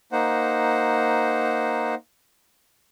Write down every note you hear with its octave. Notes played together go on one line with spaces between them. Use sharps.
A#3 D#4 C5 F#5